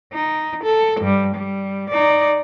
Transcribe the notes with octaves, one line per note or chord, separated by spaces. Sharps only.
D#4
A4
G2 G3
G3
D#4 D5